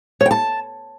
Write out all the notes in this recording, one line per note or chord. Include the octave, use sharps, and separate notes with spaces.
C#5
G5
A5